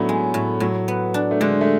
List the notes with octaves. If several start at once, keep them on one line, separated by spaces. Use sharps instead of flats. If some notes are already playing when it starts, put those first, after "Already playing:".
Already playing: A2 F#3 A3 B3 C#4 D4
G#3
A2
A2 F#3
B3
D4
A3
D3 G#3
A3